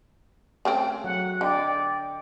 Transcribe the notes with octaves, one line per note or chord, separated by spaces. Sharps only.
C#3 A3 C4
F#3 F#5
D3 D5 D#5 G5